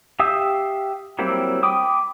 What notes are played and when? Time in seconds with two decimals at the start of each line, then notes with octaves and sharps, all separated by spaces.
0.20 G4 E5 F5 D#6 E6
1.19 F#3 G3 A#3 C4 E4
1.63 G5 B5 D6 D#6